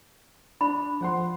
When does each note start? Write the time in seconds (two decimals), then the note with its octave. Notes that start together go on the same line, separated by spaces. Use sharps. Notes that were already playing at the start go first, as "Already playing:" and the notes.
0.61 D4 B5
1.01 F3 F#5 C6